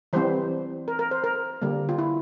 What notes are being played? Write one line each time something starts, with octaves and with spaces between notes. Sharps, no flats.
E3 G3 C4 C5
A#4
A#4
C5
A#4
D3 G3 A#3
F4
E4